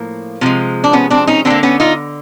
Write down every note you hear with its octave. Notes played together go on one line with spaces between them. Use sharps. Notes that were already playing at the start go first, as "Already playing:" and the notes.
Already playing: A2 F3 A#3
C3 F3 G#3
D4
B3 C#4
C4 D4
C#4 D#4
D3 G3 C4 D4
A#3
B3 C#4
D#4 F4